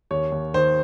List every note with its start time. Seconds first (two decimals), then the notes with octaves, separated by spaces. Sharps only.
0.11 D#2 C#5
0.32 D#2
0.54 D#3 C5